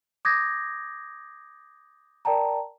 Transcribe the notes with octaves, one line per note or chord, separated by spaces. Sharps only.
D6 D#6 G6 G#6 A#6
A#4 D5 G5 A5 A#5